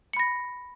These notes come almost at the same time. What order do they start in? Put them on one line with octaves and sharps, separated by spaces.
C#7 B5 A#6